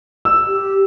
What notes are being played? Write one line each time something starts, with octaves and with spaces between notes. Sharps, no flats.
E6
G4